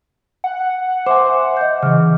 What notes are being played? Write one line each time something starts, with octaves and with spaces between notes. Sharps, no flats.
F#5
C5 E5 G#5 C6 D6
D#5 D6 G6
C#3 E3 F6